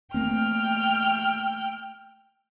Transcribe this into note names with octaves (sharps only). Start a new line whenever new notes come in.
A3 A#3 C4 G5 F6